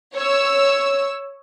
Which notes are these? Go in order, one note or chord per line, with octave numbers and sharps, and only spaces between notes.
C#5 E6